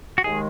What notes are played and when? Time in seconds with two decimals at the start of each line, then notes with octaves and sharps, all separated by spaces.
0.18 F#4
0.24 D#2 D#3 G#3 G#4